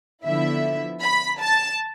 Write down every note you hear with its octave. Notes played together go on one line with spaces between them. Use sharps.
D3 F3 B3 E4 E5
B5
A5